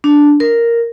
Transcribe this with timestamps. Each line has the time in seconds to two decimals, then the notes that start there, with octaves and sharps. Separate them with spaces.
0.04 D4
0.40 A#4